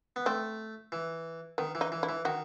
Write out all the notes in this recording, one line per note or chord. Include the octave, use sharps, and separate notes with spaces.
B3
A3 C4
E3
D#3 B3
E3
D#4
E3
E4
E3
D#3 F#4